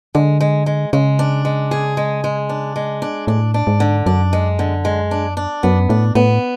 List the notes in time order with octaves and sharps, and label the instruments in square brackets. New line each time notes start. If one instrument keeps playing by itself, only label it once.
[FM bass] D3 [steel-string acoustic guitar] G#3
[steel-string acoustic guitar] G#3
G#3
[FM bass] C#3 [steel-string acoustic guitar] G#3
[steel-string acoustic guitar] D4
G#3
G#4
G#3
G#3
D4
G#3
D4
[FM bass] A2 [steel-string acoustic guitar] D4
[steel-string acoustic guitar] D4
[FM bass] G#2
[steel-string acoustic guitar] D3
[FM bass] F#2 [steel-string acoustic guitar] D4
[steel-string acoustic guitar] G#3
D3
G#3
D4
D4
[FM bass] F#2 [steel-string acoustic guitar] B3
[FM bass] A2 [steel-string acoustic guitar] D4
[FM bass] A2 [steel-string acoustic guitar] B3